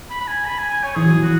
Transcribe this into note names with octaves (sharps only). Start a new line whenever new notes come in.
B5
B5
G#5
B5
G#5
G#5
C#5
E3 G#4
F#3
E3
F#4